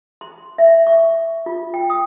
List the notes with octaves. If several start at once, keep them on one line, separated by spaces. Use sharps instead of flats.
C6
E5
C#6
F4
G5
D#6